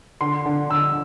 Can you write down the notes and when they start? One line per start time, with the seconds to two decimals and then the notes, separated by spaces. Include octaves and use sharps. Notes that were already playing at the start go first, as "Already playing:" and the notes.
0.21 D3 C6
0.45 D3
0.70 D3 E6